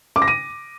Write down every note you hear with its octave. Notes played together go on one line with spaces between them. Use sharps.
D6
A#6
D#7